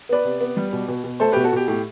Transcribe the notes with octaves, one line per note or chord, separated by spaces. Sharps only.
B3 B4 D5
C3
B3
G3
B2
B2
B2
A3 A4 C5
B2 G4 B4
F#4 A4
B2 G4
A2 G4